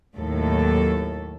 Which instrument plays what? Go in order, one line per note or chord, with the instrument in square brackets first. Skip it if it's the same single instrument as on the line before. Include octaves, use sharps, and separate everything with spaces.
[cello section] D#2 A2 F#3 A4